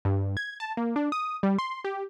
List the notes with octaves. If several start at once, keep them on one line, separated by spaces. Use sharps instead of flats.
G2
G#6
A5
A#3
D4
D#6
G3
C6
G4